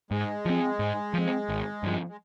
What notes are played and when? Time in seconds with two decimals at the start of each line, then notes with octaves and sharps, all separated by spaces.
0.11 G#2 G#3
0.45 F3 C4
0.79 G#2
1.13 F3 C4
1.49 G#1
1.83 G2 F3
2.09 G#3